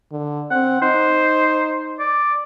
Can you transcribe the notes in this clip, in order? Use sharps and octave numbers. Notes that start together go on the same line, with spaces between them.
D3
C4 F#5
D#4 C5
D5